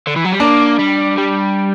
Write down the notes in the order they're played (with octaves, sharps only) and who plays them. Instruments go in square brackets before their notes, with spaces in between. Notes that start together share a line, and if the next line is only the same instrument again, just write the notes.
[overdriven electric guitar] D3
E3
F#3
G3
[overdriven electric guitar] A#3 [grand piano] D4
[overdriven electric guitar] G3
G3